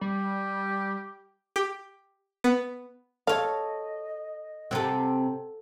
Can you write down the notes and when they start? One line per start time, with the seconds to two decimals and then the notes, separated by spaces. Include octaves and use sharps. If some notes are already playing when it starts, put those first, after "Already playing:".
0.01 G3 G4
1.56 G4
2.44 B3
3.27 A4 C#5 D#5 F5
4.71 C3 C4 A4 F#5